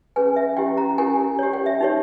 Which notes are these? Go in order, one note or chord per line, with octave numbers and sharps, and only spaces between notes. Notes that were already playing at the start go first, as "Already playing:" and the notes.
C#4 G#4 B4 G#5
E5
C#4 E4 G4 G5
A#5
C#4 E4 G4 A#4 G#5
G4 C#5
G5
E5
D#4 G4 C#5